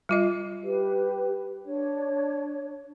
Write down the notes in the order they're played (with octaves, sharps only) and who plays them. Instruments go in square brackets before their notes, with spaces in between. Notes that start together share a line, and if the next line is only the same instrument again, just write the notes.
[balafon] G3 F4 D#5
[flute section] G4 B4
D4 C#5